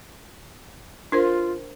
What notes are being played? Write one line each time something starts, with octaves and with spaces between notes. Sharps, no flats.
D4 F4 A#4 C5